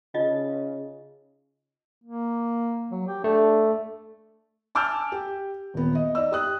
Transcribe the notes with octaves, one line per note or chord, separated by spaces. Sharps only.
C#3 D#4 F4 D#5
A#3
F#3
G4
A3 D4
G#5 A5 D6 E6 F6 G6
G4
D#1 B3
D#5
D#4 D5 E6
G4 D#6 F#6